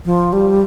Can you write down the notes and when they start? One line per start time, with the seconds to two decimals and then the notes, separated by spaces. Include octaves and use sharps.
0.05 F3
0.33 G3